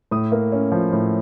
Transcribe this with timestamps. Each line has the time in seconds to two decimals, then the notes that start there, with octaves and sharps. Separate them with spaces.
0.11 A2 D#6
0.32 A#3
0.52 C#4
0.72 F3
0.93 A2